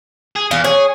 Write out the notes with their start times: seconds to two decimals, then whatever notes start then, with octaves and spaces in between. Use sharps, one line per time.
0.36 G#4
0.51 E2 F5
0.64 G#4 C#5